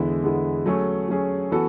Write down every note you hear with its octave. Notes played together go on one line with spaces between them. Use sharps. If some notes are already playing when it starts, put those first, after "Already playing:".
Already playing: E2 D3 G#3 B3 E4
E2 D3 G#3 B3 E4
F#3 A3 C#4 G#4
F#3 A3 C#4 G#4
E3 B3 F#4 A4